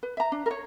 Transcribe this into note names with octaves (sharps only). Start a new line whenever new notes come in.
B4
E5 A#5
D4
A#4
C#5